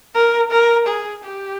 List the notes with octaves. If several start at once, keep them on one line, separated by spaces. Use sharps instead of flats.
A#4
A#4
G#4
G4